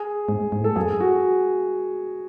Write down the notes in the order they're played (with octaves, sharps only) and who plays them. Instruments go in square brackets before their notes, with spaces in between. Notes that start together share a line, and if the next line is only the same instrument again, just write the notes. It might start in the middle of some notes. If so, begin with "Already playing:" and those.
Already playing: [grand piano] G#4
[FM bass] G#2
G#2
A2
[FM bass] G#2 [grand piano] A4
[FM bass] F#2 [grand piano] G#4
[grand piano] F#4